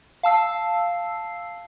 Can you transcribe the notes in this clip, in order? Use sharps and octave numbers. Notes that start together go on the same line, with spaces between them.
F5 A5 E6 C7